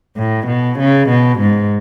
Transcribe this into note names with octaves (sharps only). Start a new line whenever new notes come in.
A2
B2
C#3
B2
G#2